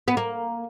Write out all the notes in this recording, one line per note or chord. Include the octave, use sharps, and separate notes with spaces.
B3
A#3